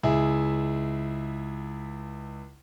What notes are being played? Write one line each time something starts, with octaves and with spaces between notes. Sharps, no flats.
C#2 E4 G#4 E5